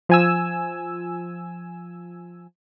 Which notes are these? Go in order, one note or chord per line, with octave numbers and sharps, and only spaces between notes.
F3 G#5 E6